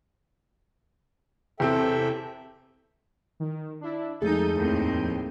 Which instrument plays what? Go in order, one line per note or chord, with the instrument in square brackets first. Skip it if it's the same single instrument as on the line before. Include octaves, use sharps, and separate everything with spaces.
[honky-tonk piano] E2 C3 C4 [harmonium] A4 E5 G5
[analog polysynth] D#3
D4 E4
[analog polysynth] F2 G6 D#7 [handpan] G#3 A3 G#4 [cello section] D#4 A4
[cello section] D#2 A2 C4 [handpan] D#4